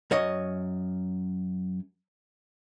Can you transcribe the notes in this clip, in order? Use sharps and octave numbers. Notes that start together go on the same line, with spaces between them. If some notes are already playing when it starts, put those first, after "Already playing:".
F#2 C#5 D#5